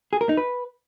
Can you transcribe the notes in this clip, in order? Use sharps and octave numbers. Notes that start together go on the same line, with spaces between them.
G#4
A#4
D#4
B4